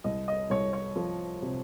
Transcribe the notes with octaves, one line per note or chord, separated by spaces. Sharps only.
C2 D#5
D#5
C2 C#5
C#5
F3
C3